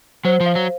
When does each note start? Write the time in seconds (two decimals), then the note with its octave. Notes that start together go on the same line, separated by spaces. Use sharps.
0.25 F#3 C5
0.40 F3
0.46 F5
0.55 F#3